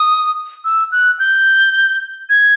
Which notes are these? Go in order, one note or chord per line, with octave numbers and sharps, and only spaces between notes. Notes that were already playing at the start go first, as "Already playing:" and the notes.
Already playing: D#6
E6
F#6
G6
G#6